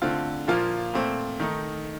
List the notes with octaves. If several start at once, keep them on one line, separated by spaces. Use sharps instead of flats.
D3 A3 C4 F4
A#2 F3 A#3 F4
A#2 A3 C4
D#3 A3 D#4